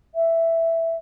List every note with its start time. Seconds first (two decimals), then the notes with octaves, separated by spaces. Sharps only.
0.14 E5